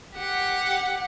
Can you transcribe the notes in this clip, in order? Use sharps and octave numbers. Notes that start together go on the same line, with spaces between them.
G4 F#5